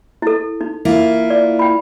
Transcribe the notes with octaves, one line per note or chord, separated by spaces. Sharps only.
E4 A4
D#4
A#3 E4 F4
D5
G5 B5